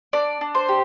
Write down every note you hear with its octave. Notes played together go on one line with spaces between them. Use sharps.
D4 D5
D4
C5
G4